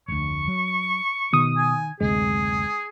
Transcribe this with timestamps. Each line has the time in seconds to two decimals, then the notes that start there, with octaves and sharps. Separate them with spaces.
0.08 F1 D2 C#6
0.48 F#3
1.33 B2 D#3 D#6
1.57 G#5
2.00 F#1 D2 C3 G#3 G#4